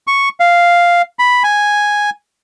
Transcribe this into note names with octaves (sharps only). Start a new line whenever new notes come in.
C#6
F5
B5
G#5